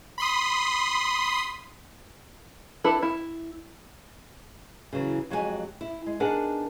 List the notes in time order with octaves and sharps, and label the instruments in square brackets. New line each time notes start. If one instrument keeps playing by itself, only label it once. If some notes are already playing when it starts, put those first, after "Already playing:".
[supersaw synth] B5 C6 D#6
[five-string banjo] D4 E4 A4 B4
E4
[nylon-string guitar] C#3 E3 F#3
F2 F#3 G#3 F#4 G4 G#5
E4
G#3
B3 D4 D#4 G#4 A#4 F#5